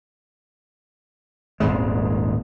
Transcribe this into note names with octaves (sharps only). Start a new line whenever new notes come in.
D#1 G#1 G#3